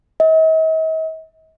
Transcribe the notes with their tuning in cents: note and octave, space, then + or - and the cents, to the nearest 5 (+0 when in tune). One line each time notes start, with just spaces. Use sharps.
D#5 +45